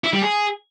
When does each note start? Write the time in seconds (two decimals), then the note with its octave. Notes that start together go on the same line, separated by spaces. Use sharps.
0.04 E4
0.13 G3
0.22 G#4